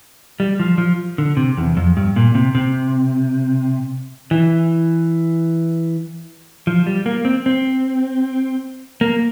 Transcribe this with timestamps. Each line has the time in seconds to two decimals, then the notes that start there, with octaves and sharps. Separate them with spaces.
0.40 G3
0.60 F3
0.78 F3
1.18 D3
1.37 C3
1.57 E2
1.77 F2
1.97 G2
2.16 A#2
2.35 C3
2.55 C3
4.31 E3
6.67 F3
6.86 G3
7.06 A#3
7.25 C4
7.46 C4
9.01 A#3